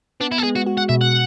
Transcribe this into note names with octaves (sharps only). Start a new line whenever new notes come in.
B3 D4
E4
A4
G#3 G#4
F#4
F#4
F#5
B2 E5
F#5